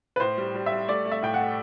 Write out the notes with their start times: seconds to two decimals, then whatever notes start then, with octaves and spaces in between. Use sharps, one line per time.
0.16 B4
0.20 A2 C5
0.38 G3
0.54 G3
0.66 G3 E5
0.88 A3 D5
1.05 A3
1.12 E5
1.22 A2 G5
1.34 F#5
1.40 A3